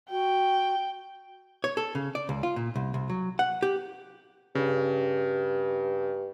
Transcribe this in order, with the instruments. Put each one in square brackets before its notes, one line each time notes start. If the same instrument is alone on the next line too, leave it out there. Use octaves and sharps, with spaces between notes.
[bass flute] F#4 [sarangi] G5
[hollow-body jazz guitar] C#5
A4
C#3
D5
C#2
F4
A#2
C2
C2
F#3
F#5
G4
[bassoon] G2 [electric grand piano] C#3